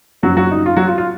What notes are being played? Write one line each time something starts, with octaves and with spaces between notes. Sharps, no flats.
F#1 F#2 F3 F#3 F#4
F#3 F#4
D#4
F4
F#3 F#4
F4
F4